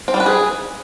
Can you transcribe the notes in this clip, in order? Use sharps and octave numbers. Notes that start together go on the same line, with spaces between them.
C4
G3
B4
G#4